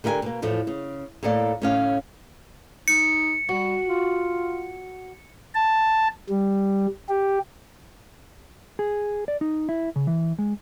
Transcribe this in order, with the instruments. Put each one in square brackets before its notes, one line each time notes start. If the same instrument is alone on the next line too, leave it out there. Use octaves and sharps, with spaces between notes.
[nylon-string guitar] D3 G4 A#4 D#5 G#5
B2 A#3
E2 A2 F3 A3
C#3
A2 A#3 A4 D5 F5
A2 C#4 F5
[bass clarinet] D#4 [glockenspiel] C#7
[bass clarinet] G3 [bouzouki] F#4
[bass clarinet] F4
[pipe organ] A5
G3
G4
[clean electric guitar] G#4
D5
D#4
E4
C#3
E3
G#3